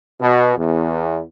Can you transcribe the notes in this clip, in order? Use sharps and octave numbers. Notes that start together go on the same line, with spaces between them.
B2
E2